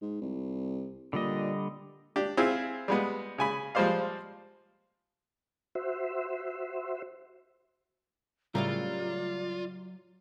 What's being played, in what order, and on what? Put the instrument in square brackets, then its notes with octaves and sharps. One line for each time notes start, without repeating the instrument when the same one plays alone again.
[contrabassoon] G#2
C2
[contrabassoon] A#2 [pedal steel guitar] D3 G3 D#5
[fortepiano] D4 G4
C4 E4 F4 G#4
G3 G#3 B3
C#3 G#5 B5
F3 G3 G#3 C5 D5 F5
[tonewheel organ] F#4 C5 E5
[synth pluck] A2 C#3 G3 [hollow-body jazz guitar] F#3 E4 A#4 [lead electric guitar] F4 [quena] D5